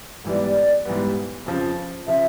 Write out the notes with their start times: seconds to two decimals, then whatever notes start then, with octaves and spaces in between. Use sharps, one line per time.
0.25 G#2 E3 G3 B3 D5
0.85 G#2 E3 G3 B3
1.46 F2 C#3 F3
2.07 C#3 F3 E5